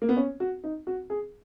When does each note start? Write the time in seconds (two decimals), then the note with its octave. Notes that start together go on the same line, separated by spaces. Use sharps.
0.02 A#3
0.09 B3
0.17 C#4
0.40 F#4
0.64 D#4
0.87 F#4
1.10 G#4